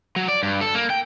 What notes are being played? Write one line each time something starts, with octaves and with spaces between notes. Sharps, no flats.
F#3
D5
G2
A4
A#3
G5